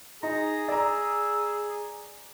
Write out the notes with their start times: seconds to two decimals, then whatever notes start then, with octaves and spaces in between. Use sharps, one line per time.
0.23 D#4 G#4 A#5
0.68 D5 A#5 E6